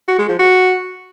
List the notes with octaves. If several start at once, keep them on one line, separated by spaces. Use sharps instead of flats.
F#4
G#3
F3
F#4